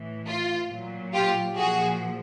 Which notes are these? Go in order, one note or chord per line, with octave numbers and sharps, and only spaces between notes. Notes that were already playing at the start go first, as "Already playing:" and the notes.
Already playing: A2 E3
F4
A#2 F#3
F4 G4
A#2 F3 F#4 G#4